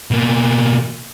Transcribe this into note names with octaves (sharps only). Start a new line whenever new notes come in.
B2 A#3